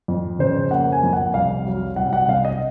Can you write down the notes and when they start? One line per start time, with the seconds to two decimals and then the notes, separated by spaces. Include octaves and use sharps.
0.08 F2
0.39 C#3 C5
0.70 A#3 F#5
0.92 G#5
1.03 F2
1.13 F#5
1.34 C2 F5
1.66 F#3
1.96 C2 F#5
2.13 F#5
2.28 C3 F5
2.45 D#5